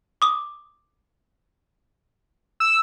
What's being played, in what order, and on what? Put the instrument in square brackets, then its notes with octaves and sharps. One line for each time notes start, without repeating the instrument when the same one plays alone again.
[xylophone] D6 D#6
[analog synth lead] E6